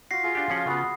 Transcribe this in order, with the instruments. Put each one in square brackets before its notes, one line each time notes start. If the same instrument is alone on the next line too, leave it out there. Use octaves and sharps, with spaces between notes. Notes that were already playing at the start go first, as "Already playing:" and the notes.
[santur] F4 F#4 [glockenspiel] A#6 C7
[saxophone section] F4 [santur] G#4
[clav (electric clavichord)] D4 G4
F3 C#4 F#5
[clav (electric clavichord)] C#3 B3 [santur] F#5 [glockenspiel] B5 D#6